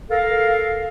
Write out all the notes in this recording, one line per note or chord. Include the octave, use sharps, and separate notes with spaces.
A4 A#4 F5